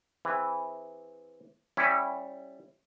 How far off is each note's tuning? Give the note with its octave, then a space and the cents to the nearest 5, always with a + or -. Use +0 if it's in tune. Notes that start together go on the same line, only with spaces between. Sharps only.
E3 -5 C4 +0 G#4 -35
G3 -10 C#4 -20 E4 +0